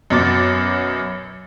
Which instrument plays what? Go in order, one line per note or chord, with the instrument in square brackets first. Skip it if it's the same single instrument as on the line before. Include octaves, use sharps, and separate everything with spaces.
[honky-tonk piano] F#2 B2 D6 A6